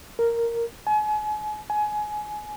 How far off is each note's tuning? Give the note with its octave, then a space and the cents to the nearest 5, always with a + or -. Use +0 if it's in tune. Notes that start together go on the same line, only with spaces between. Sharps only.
A#4 -5
G#5 +35
G#5 +20